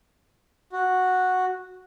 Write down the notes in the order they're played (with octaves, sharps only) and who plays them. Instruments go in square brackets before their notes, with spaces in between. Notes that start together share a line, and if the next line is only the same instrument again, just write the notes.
[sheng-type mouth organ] F#4